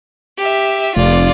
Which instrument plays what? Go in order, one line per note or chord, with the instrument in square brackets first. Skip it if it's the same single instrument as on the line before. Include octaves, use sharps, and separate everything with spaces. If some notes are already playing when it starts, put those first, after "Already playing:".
[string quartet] G4 E5
[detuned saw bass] F1 [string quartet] F4 D5